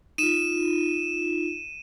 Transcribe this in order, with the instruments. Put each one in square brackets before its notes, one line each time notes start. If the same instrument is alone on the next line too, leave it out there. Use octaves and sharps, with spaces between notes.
[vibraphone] D#4 F4 [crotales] D#7 E7